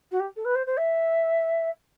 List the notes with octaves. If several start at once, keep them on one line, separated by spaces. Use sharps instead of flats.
F#4
G4
A4
B4
C5
C5
E5